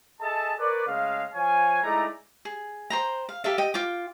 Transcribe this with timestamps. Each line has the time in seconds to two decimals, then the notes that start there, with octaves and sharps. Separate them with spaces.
0.21 G#4 A4 D#5 E5 A5
0.58 A#4 B4 C#5 D5
0.87 C#3 G#3 A3 F5
1.34 F3 C#5 F5 G#5
1.83 G#3 A3 D#4 E4 D5 A#5
2.45 G#4
2.90 C5 G5 A#5
3.29 F5
3.44 G4 A4 E5 F5
3.58 D#5 G5
3.74 F4 G5 D6